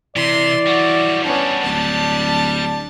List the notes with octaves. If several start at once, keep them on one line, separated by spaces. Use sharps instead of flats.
C3 E3 D5 C6
F#3 G3 F#4
B3 C#4 D4
D1 A5